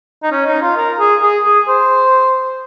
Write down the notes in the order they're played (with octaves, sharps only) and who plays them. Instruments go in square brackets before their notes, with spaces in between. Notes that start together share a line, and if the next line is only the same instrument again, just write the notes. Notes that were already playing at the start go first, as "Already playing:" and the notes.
[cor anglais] D#4
C#4
D#4
F4
A#4
G#4
G#4
G#4
C5